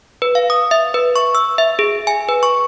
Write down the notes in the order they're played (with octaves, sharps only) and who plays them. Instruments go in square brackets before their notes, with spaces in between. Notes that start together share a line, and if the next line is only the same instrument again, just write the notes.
[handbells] B4
F5
D#6
E5
B4
C#6
E6
E5
G#4
G#5
B4
C#6